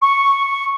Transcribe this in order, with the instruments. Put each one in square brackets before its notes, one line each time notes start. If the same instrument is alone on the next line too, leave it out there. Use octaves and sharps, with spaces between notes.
[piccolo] C#6